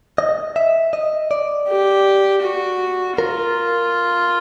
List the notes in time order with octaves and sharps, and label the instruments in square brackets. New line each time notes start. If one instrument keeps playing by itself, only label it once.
[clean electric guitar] D#5
E5
D#5
D5
[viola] G4
F#4
[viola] F4 [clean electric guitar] A#4